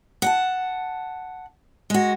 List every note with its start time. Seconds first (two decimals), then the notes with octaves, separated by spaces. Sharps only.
0.22 F#5 G5 A5
1.90 G#3 F#4